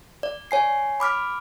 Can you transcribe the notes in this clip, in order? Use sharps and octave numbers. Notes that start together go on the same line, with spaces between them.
D5
C#5 G#5 C7
B5 D6 F6 B6